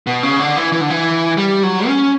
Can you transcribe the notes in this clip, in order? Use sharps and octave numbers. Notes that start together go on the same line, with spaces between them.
B2
C#3
D3
E3
E3
D3
E3
G3
F#3
C#4